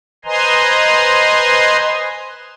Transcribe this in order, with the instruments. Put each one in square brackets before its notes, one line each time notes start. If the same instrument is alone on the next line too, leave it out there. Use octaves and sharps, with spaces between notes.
[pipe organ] B4 C5 D#5 G#5 A#5 C6